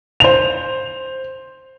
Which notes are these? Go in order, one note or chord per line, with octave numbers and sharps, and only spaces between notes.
C5 F7